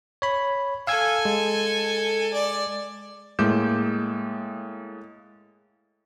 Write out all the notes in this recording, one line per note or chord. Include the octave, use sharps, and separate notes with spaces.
C#5 B5
A4 F5 G#5 E6 G#6
G#3
D5
A2 G#3 A#3 D6 G6 E7